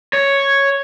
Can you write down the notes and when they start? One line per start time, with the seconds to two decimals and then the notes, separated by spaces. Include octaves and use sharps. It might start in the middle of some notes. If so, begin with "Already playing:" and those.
0.13 C#5